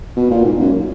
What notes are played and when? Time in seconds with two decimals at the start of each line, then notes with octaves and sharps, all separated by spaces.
0.16 B2
0.31 A#2
0.45 G#2
0.60 F#2